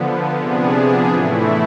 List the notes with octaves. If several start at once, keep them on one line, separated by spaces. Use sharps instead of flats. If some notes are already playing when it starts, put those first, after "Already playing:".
Already playing: D3 F3 B3
C3 F3 B3 D4 G#4
A2 E3 A3 E4